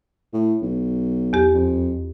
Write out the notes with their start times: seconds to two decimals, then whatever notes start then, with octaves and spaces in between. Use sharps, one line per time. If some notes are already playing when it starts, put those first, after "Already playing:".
0.33 A2
0.62 B1
1.33 E2 G4
1.54 F2